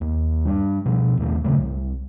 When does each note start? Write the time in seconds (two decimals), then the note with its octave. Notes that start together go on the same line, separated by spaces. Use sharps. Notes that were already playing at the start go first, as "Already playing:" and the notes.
0.01 D#2
0.46 G3 D4
0.85 B2 F3
1.18 D#2 A2 A3
1.44 A#2 C#3 F#3 A3
1.59 C2